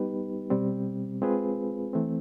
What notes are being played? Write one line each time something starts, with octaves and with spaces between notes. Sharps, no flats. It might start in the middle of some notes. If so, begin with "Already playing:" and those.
Already playing: G3 B3 D#4 G4 B4
B2 G3 C4
G#3 C4 F4 G#4 B4
E3 A3 C4